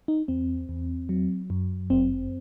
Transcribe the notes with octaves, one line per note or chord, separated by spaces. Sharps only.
D#4
E2 C4
E2
F#3
F#2
G1 C4